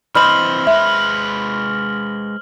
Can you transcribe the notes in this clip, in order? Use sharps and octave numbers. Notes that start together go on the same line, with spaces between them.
E3 C4 C5 D#5 B5 F6 F#7
G#3 B4 E5